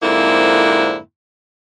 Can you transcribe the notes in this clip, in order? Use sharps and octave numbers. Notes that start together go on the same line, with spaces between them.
F2 G#2 D3 A#3 C4 E4